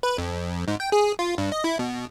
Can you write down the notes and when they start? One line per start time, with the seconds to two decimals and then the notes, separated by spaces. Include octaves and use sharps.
0.03 B4
0.18 F2
0.68 G#2
0.80 G5
0.92 G#4
1.19 F4
1.38 G2
1.52 D#5
1.64 E4
1.79 B2